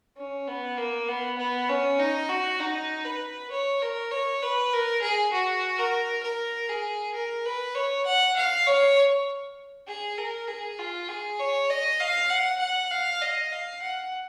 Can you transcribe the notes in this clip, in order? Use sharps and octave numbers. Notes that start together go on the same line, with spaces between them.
C#4
B3
A#3
B3
B3
C#4
D#4
F#4
D#4
B4
C#5
A#4
C#5
B4
A#4
G#4
F#4
A#4
A#4
G#4
A#4
B4
C#5
F#5
F5
C#5
G#4
A#4
G#4
F4
G#4
C#5
D#5
F5
F#5
F#5
F5
D#5
F5
F#5